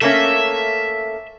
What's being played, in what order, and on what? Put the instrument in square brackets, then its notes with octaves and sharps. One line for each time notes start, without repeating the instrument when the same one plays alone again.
[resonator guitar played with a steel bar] A3 A#3 C#4 [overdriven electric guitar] E5